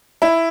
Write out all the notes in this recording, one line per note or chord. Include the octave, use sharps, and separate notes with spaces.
E4